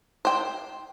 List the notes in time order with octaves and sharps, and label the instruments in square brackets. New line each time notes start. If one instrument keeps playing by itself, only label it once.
[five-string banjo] C5 G5